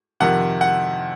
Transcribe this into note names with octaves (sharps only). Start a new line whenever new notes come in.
F2 C3 D#3 F#5
F#5